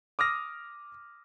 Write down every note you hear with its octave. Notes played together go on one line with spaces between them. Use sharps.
D6 D#6 F6 A#6